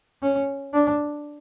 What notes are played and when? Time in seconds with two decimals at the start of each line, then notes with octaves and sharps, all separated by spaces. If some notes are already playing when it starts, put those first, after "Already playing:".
0.22 C#4
0.73 D4